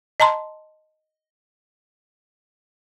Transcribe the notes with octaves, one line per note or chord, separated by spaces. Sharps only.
D#5 A5 A#5 C6